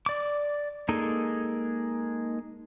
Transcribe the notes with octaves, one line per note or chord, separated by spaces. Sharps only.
D5 D6
G#3 A#3 D#4 G#4 A4